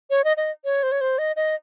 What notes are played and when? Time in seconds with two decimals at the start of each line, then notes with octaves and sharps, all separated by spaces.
0.10 C#5
0.24 D#5
0.37 D#5
0.65 C#5
0.83 C5
0.92 C#5
1.01 C5
1.18 D#5
1.36 D#5